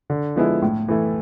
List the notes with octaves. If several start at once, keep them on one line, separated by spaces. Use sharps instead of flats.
D3
F3 G#3 B3 E4
A2
E3 A3 E4